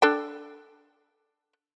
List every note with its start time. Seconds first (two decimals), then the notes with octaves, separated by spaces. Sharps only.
0.02 D4 A4 G5